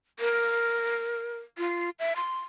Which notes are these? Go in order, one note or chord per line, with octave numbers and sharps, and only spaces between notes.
A#4
F4
E5
C6